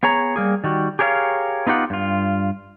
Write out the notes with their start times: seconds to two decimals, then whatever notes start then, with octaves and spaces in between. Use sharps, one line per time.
0.03 B3 G#4 C#5 A#5
0.36 G3 A#3 G#4
0.64 D#3 G3 F#4
0.99 G4 G#4 A#4 C#5 E5 F5
1.67 B3 D#4 F4 G4 F#5
1.90 G2 F4